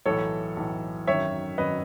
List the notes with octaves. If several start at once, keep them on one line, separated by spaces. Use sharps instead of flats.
B1 A2 E3 A4 C#5
B1 A2 E3
G#1 F#2 D#3 C#5 E5
G#1 F#2 D#3 B4 D#5